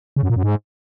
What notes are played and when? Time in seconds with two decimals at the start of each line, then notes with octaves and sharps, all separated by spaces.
0.16 C#3
0.23 F#2
0.30 A#2
0.36 F#2
0.43 G#2